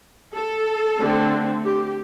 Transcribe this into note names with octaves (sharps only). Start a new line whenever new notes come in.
A4
D3 A3 C4
G4